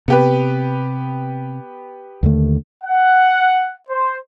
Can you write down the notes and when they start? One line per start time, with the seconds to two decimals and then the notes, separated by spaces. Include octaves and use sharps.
0.08 C3 B3 G4 B4
2.23 D#2 D3 A3
2.83 F#5
3.88 C5